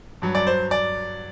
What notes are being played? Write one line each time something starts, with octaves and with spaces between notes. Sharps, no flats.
G2 F#3
D5
C5
D5